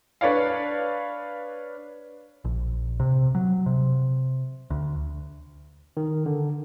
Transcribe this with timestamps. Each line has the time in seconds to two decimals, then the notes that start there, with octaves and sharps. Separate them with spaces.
0.21 D4 B4 C#5 D5 F5
2.44 A#1
3.00 C3
3.35 F#3
3.66 C3
4.70 D2
5.97 D#3
6.26 D3